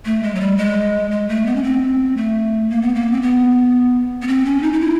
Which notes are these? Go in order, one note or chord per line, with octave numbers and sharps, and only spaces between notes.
A3
G#3
F#3
G3
G#3
G#3
A3
B3
C#4
C4
A3
A#3
B3
A#3
C4
B3
B3
C4
C#4
D#4
D#4
E4